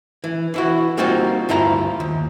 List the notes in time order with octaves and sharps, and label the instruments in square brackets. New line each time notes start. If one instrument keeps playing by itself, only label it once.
[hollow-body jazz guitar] E3
E3 E4 F#4
G3 A#3 C4 D#4 F4 F#4
D2 G2 E4 F4 A#5
D#2